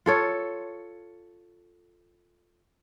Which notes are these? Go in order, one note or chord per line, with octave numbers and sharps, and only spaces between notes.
F4 A4 C#5